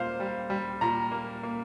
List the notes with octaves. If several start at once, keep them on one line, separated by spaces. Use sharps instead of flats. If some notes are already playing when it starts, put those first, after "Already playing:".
Already playing: A#2 G3 A#3 C5 F5
G3
G3
A#2 A#5
A#3
A#3